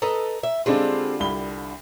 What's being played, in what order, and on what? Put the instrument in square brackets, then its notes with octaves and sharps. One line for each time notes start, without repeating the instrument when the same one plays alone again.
[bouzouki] A4 B4 D#5 [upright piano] A#5
[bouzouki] E5
[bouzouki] D3 G3 F4 [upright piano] G#3 C4 D4
[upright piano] C2 B5 G7